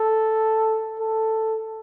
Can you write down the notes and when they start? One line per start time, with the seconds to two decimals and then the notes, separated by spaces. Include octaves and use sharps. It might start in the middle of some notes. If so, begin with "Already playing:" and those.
Already playing: A4
0.99 A4